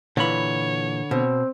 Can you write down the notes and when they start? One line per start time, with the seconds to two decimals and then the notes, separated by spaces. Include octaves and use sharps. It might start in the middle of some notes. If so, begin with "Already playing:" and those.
0.17 A#2 D3 E3 C#5 B5
1.11 B2 C4